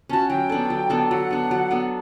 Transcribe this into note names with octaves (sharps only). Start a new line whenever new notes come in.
C#4 F#4 A5
F#3 G5
B3 D4 A4
F#3
B3 D4 A4
F#3 F#5
B3 D4 A4
F#3
B3 D4 A4